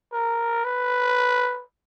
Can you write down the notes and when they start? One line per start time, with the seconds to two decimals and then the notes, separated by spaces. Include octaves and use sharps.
0.13 A#4
0.65 B4